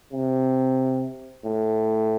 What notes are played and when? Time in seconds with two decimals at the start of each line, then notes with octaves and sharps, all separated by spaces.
0.12 C3
1.45 A2